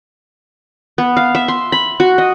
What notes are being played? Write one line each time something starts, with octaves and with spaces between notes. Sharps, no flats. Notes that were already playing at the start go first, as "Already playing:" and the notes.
B3
F5
E5
C6
B5
F#4
D#5